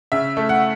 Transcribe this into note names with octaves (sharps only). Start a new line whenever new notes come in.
C#3 E5
A3
F#5